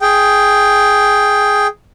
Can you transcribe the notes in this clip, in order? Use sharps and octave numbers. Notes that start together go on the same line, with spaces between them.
G#4 G5